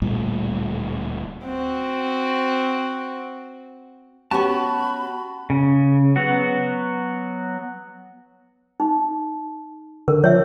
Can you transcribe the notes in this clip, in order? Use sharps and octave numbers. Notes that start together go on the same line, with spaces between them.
D1 A#2 G3 A3
C4 F#4
B3 C#4 F#4 G4 A5 B5 C#6
C#3
F#3 B3 F#4
D#4
D3 A#4
F3 C#5 E5